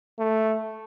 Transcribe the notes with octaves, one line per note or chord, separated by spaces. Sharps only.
A3